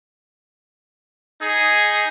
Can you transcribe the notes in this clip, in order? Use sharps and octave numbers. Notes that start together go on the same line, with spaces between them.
D#4 G#4